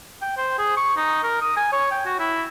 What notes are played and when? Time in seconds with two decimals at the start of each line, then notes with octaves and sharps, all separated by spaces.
0.22 G5
0.37 C5
0.58 G#4
0.76 C#6
0.97 D#4
1.23 A#4
1.41 D#6
1.56 G#5
1.72 C#5
1.91 G5
2.05 F#4
2.19 E4